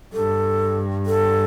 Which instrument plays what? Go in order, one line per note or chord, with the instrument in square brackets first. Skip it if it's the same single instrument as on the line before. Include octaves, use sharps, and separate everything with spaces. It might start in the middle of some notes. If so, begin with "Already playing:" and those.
[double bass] G2 [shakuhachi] A4
[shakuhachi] A4